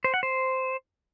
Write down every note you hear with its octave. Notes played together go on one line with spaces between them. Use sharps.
C5
F#5
C5